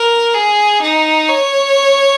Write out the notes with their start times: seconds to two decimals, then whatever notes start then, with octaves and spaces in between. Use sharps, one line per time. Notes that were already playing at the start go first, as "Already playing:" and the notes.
Already playing: A#4
0.34 G#4
0.82 D#4
1.29 C#5